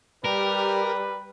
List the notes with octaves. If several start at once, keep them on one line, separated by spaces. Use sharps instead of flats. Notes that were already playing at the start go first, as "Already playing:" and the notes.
G3 G4 A#4 B4